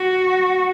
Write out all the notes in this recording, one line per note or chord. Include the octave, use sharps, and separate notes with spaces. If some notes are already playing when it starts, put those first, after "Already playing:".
Already playing: F#4